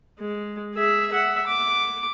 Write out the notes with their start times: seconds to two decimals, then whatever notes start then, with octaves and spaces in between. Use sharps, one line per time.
0.19 G#3
0.74 G#4 E5
1.12 E5 F#5
1.47 D6